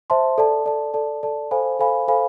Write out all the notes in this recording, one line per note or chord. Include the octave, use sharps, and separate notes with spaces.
C5 E5 A5 C6
A4 D5 A5
A4 D5 A5
A4 D5 A5
A4 D5 A5
A4 C5 F5 G#5 B5
A4 C5 F5 G#5 B5
A4 C5 F5 G#5 B5